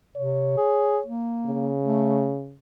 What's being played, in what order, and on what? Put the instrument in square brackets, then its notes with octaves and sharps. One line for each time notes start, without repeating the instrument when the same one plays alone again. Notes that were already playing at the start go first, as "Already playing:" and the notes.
[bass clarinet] C3 [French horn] C#5
[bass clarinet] G#4
A#3
[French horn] C#3
[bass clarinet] A3